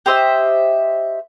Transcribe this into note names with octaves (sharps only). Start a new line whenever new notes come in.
G4 C5 D#5 E5